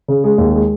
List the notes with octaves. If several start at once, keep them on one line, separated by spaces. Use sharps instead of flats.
C#3
G#3
D#2
G#3